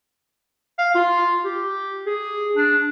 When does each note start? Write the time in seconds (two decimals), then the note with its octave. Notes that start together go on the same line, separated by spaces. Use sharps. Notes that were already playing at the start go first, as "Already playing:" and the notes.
0.79 F5
0.95 F4
1.44 G4
2.06 G#4
2.56 D4